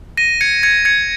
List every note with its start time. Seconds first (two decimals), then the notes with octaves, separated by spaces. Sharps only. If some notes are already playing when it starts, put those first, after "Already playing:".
0.17 A#6 D#7
0.41 G#6 C#7
0.63 G#6 C#7
0.85 G#6 C#7